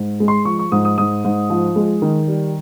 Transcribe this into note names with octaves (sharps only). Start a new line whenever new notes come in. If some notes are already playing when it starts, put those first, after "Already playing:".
Already playing: G#2
G#3
C6
F3 C#6
C#6
G#2 D#6
D#6
G#2 D#6
G#2
F3
G#3
D#3
G3